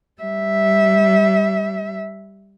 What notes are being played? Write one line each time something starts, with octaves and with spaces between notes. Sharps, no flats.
G3 E5